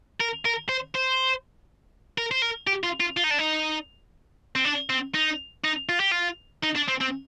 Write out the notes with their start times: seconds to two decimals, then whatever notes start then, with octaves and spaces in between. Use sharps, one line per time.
0.20 A#4
0.45 A#4
0.69 C5
0.95 C5
2.18 A#4
2.31 C5
2.42 A#4
2.67 G4
2.84 F4
3.00 F4
3.17 F4
3.24 D#4
3.31 D4
3.38 D#4
4.56 C4
4.65 D4
4.90 C4
5.15 D#4
5.64 D#4
5.89 F4
6.00 G4
6.12 F4
6.63 D#4
6.75 D4
6.88 C4
7.01 C4